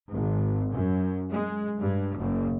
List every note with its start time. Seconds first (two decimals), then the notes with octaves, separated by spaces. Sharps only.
0.13 G#1
0.72 F#2
1.30 G#3
1.79 G2
2.16 F#1